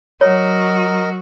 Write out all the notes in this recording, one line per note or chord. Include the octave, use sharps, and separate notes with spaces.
F#3 F#4 A#4 C#5 D#5